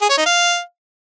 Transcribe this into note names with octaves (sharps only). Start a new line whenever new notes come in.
G#4
C#5
D#4
F5